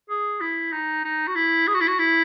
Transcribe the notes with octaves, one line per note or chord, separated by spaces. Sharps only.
G#4
E4
D#4
D#4
F#4
E4
G#4
F#4
E4
F#4
E4